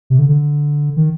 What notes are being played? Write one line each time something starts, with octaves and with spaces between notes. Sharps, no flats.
C3
D3
D3
D#3